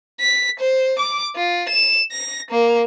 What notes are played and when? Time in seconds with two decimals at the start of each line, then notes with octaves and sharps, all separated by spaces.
0.20 B6
0.60 C5
0.99 D6
1.36 F4
1.69 E7
2.12 A#6
2.51 A#3